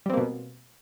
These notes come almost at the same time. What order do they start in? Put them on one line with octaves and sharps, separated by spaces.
G3 C4 A#3 B2